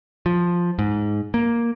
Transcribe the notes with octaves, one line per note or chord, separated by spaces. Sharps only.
F3
G#2
A#3